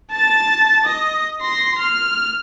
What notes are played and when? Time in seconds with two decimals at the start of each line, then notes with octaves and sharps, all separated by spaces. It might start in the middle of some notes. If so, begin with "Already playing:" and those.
0.12 A5 A6
0.85 D#5
1.42 C6 A#6
1.79 F6